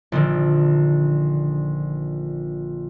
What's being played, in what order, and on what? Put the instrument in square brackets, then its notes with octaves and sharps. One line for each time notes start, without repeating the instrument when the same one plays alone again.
[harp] A#1 D3 D#3